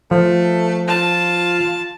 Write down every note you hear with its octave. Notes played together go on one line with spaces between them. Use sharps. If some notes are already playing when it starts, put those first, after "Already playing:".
F3 A3
F4 A5